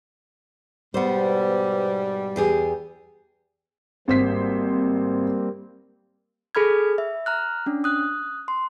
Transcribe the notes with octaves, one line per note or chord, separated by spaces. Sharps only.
G#2 B2 G3 B3 C5
E2 G4 G#4
G#1 G3 A#3 C4 C5 B6
G#4 A4 B5 F6 G#6
E5
A#5 F6 F#6
C#4 D4
D#6 F#6
C6